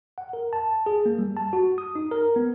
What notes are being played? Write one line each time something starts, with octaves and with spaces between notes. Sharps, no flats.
F#5
A#4
A5
G#4
A#3
G3
A5
F#4
D#6
D#4
A#4
B3